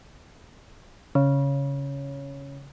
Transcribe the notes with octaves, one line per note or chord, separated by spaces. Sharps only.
C#3